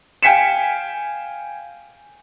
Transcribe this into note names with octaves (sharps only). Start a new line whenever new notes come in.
F5 G5 G#5 B6 C#7 E7